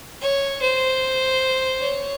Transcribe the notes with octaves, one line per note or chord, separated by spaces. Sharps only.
C#5
C5
C#5